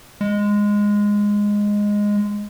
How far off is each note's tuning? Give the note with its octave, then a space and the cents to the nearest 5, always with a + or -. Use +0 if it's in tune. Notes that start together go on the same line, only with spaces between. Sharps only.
G#3 -10